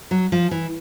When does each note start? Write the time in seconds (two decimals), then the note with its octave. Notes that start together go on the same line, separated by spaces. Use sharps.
0.11 F#3
0.32 F3
0.51 E3